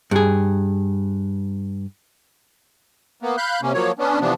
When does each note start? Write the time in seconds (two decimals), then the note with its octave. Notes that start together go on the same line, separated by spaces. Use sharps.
0.11 G2 G#4
3.22 A#3 B3
3.37 F5 B5 F#6 G6
3.62 C3 A#3 C#4
3.74 F3 F#3 A#3 C#5
3.99 B3 C#4 D4
4.20 C3 E3 F3 B3 D4